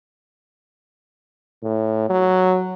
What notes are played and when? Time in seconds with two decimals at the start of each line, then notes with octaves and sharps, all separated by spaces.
1.63 A2
2.09 F#3